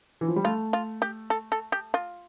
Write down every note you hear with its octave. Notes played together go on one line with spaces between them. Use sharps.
E3
F3
G3
A3 F4
F4
G4
A4
A4
G4
F4